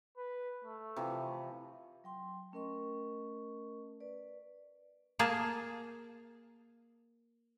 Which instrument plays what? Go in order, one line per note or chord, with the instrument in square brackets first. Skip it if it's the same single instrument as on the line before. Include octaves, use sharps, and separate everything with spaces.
[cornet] B4
A3
[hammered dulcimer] C3 E3 F3
[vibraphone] F#3 G5 C6
A3 C#4 A#4 D#5 C#6
B4 D5
[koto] A#3 G#4 A5